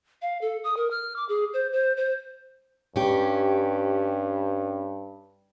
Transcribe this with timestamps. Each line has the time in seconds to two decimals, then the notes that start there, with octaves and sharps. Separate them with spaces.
0.22 F5
0.41 A4
0.64 D#6
0.77 A#4
0.91 F6
1.16 D6
1.29 G#4
1.54 C5
1.72 C5
1.97 C5
2.96 G2 C#4 G4